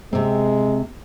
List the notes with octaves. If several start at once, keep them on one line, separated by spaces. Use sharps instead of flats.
C3 G#3 C4